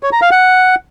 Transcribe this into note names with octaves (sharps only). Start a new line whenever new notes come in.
C#5
A#5
F5
F#5